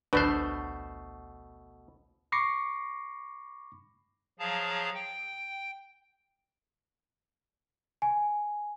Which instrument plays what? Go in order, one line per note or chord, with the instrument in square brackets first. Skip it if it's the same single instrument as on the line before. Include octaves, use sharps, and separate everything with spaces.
[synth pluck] A1 D2 [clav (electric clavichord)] B2 A3 C5 [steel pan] D4 B4
[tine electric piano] B5 C#6 D6 A#6 C7 C#7
[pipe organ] F3 F#3 G#4 F5 A5 A#5
G5
[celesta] G#5